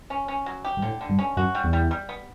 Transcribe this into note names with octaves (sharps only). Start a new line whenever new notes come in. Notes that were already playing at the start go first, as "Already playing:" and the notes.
C#4
C#4
F#3
G4
G2
A2 D3
D3
G2
C#4
F#2 F#4
G3
E2
G3
G3
B3